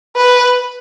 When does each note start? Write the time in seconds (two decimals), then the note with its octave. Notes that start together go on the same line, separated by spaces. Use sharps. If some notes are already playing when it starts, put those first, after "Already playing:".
0.17 B4